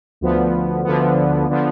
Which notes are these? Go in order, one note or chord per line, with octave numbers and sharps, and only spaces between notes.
D2 D3 F3 B3
D2 D3 F3 B3
D3 F3 B3